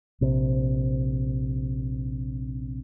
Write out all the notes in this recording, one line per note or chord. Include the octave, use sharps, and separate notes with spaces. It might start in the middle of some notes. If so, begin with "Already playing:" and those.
A#1 C3